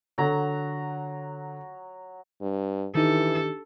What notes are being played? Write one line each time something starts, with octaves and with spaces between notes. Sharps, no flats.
D3 F#3 A#5
G2
D#3 E3 D4 D#4 G4 A4